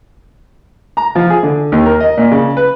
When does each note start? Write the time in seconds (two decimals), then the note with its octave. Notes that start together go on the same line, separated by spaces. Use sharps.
0.97 A#5
1.16 F3
1.30 G#4
1.43 D3
1.72 D#2
1.86 A#4
2.00 D#5
2.17 A#2
2.31 C#3
2.57 B4